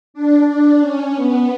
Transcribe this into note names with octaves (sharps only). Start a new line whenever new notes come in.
D4
D4
C#4
B3